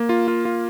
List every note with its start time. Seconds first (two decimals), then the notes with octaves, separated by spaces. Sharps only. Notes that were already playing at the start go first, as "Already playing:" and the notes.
Already playing: A#3
0.09 F4
0.28 F4
0.45 F4